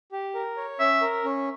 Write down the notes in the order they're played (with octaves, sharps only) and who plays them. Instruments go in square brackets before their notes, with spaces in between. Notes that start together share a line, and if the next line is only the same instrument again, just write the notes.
[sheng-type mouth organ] G4
A#4
C#5
[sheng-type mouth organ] C#4 [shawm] E5
[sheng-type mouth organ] A#4
C#4